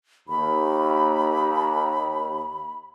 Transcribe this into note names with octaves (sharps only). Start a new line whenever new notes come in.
D#2 B5